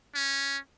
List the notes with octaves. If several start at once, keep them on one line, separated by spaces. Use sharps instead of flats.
C#4